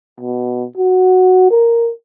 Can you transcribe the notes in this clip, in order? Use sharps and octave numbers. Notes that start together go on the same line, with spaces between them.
B2
F#4
A#4